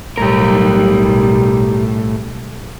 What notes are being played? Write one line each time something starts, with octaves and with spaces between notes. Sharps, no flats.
B1 A2 G3 G4 A#4